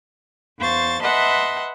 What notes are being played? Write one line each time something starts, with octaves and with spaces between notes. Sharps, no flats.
E2 C5 F5 C#6 A6
B4 D#5 E5 F#5 A5 C6